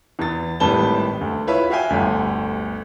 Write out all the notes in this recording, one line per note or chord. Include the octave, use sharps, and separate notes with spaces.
E2 E3 A6
G#1 A2 G3 B4 A5 G7
D2
E4 F4 B4 C#5 E5
F#4 E5 F5 G5 G#5
G1 D2